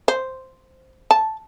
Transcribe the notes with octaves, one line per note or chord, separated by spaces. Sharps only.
C5
A5